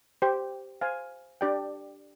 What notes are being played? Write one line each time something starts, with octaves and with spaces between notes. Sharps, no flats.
G4 C5 G5
C5 F5 G#5
D4 G4 D5 G5